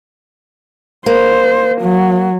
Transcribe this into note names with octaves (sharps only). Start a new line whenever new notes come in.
A#3 C5
F#3